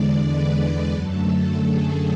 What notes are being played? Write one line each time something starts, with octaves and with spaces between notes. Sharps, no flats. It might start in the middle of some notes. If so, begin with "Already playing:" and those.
Already playing: E2 D3 G#3 D5
B4
F#2 D3 F#3 A3 A4
G#4